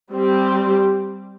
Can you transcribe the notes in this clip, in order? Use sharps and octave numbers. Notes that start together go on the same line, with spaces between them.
G3 C4 G4